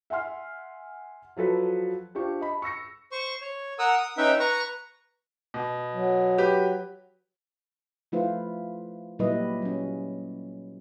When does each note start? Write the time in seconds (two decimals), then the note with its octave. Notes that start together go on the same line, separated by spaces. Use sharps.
0.10 E5 F#5 G#5 C6 F6
1.37 F3 F#3 A4 B4
2.15 D4 F4 G4 C5 C#6
2.41 D#5 A5 B5
2.62 C#6 E6 A#6 C#7
3.12 C5 C#6
3.41 C#5
3.79 A#4 F#5 D#6 E6
3.98 D#6
4.18 C#4 D#4 B4 E5 G5
4.40 B4 A#5 C#6
5.54 B2
5.94 F#3
6.38 G4 B4
8.12 F3 A3 E4 F4 B4 C5
9.19 A#2 F#3 G3 E4 B4 D#5
9.62 F#3 C#4